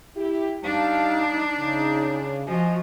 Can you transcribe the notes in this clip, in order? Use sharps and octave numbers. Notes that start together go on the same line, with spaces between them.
E4 G4
G3 D4 D#4 F5 A5
C#3 D#4
F3 F#4 D#5 G#5